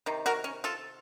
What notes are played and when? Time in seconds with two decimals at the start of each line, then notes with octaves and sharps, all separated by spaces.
0.06 C3 D#3
0.26 F#4 A#4
0.44 C#4
0.64 F4 A4